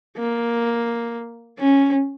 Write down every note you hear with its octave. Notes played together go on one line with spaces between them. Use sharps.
A#3
C#4